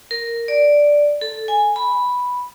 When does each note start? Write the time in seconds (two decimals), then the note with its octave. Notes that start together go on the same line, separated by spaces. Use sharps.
0.11 A#4
0.48 D5
1.21 A4
1.48 G#5
1.76 B5